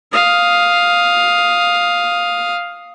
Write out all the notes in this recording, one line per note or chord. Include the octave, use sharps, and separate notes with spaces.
F5 D#6